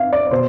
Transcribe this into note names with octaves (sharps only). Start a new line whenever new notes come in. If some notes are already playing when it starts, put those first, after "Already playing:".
Already playing: E5 F5
D5
D5
B2 C5